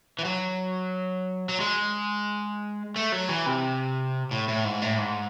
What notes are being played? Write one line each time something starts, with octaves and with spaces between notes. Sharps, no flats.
E3
F#3
F#3
G#3
A3
F#3
E3
C3
A2
A2
G#2
A2
G#2